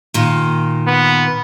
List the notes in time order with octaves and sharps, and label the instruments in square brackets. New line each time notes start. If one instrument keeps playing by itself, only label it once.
[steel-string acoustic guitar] A#2 D#3
[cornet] B3